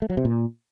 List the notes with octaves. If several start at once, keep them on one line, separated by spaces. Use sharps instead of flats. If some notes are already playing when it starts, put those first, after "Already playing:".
A3
F#3
C3
A#2